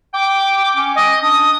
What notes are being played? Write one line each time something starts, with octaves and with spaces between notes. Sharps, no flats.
G5 D6
C#4
D#5
D4 D#6